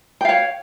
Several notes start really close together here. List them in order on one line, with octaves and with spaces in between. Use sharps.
G5 F5 C#5